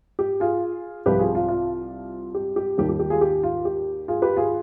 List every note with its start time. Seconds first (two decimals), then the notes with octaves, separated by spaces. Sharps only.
0.19 G4
0.40 F4 G#4
1.06 C2 C3 F3 G4 B4
1.19 F4 G#4
1.35 F4
1.48 F4
2.35 G4
2.56 G4
2.78 D#2 D#3 G3 G4
2.89 G4
3.00 G4
3.10 F4 G#4
3.21 G4
3.43 F4
3.65 G4
4.08 F4 G#4
4.22 G4 B4
4.36 F4 G#4